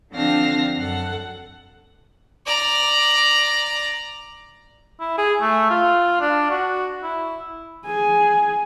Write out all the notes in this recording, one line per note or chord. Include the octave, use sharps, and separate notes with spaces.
D3 F3 C4 D4 F5 A#6
F#2 A4 F#5
D5 A#5
E4
G#4
A3
F4
D4
F#4
E4
G#4 G#5